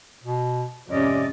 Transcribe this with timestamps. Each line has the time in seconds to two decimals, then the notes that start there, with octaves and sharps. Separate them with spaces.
0.24 B2
0.88 F2 G#2 C3 C#4 D5 D#5 D6